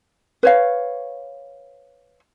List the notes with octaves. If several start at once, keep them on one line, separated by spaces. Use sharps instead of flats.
B4 C#5 F5